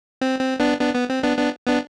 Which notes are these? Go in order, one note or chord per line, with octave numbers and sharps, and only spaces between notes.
C4
C4
B3 D4
B3 D4
B3
C4
B3 D4
B3 D4
B3 D4